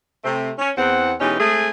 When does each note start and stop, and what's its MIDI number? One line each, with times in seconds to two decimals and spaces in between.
0.24 0.51 48
0.24 0.51 57
0.24 0.51 60
0.58 0.70 61
0.77 1.13 40
0.77 1.13 60
0.77 1.13 78
1.20 1.35 47
1.20 1.35 52
1.20 1.35 56
1.20 1.35 61
1.20 1.35 63
1.20 1.35 67
1.40 1.70 56
1.40 1.70 57
1.40 1.70 60
1.40 1.70 68